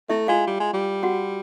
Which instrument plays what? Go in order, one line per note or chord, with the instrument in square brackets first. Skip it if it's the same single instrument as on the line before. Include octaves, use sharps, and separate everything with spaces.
[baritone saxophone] A3 [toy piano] E4 E5
[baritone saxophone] G#3 [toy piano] F4 F5
[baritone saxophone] G3
G#3
G3
[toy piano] F#4 F#5